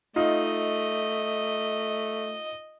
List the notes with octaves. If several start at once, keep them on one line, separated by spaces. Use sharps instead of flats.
A3 D#4 F4 D#5